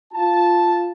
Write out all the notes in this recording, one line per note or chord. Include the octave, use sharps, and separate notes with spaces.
F4 A5